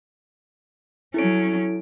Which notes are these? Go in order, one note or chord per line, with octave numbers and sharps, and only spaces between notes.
F#3 C#4 E4 A4 D7